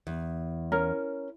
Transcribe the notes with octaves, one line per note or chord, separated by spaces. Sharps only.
E2
C#4 A#4 A#5